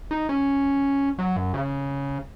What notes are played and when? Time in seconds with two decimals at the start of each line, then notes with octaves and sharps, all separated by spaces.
0.11 D#4
0.29 C#4
1.19 F#3
1.37 F#2
1.54 C#3